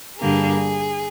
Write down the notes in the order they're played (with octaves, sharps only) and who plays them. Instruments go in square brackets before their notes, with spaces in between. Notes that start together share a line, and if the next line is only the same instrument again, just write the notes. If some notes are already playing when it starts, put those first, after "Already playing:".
[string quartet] G2 D3 G3 A#3 G#4